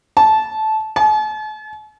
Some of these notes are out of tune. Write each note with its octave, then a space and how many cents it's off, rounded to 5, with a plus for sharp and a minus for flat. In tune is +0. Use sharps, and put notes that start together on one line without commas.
A5 -15
A5 -45